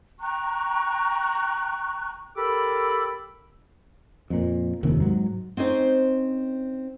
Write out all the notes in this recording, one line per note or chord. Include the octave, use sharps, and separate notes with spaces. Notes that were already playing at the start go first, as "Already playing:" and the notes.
G5 A#5 C#6 F#6
G4 A4 A#4 B5 D6 E6
F2 A#2
F1 D#2 C3 D#3
G#2 F#3
C4 C#4 D#4 C5